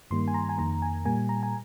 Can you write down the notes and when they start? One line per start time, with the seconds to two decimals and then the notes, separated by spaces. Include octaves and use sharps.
0.11 G2 D#3 G3 A#3 C6
0.28 G#5
0.34 A#5
0.49 G#5
0.58 F2 D#3 A#3 A#5
0.82 G#5
1.05 A#2 G3 A#3 G#5
1.29 A#5
1.43 G#5